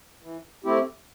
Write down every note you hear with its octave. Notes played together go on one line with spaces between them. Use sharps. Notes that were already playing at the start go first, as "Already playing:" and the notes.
E3
A3 C4 E4 G4